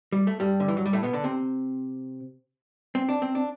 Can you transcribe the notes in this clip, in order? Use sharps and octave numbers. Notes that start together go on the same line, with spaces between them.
G3
A3
G2 G3
D3
E3
F#3
G3
A2 A3
B2 B3
D3 D4
C3 C4
C4
D4
C4
D4